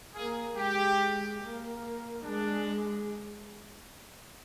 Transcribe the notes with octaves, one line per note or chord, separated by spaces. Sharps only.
A#3 G#4
G#3 G4
A#3
G#3 D4